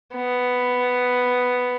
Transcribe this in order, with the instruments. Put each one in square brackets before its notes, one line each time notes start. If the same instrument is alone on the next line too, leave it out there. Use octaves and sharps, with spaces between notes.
[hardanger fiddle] B3